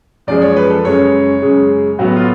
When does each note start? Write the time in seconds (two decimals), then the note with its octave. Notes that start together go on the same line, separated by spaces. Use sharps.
0.27 F#2 F3 G#3 D5
0.42 C#5
0.56 B4
0.70 A4
0.85 F#2 C#3 G#3 C#5
1.42 F#2 C#3 G#3
1.99 A2 F#3 B3 F#4
2.16 F4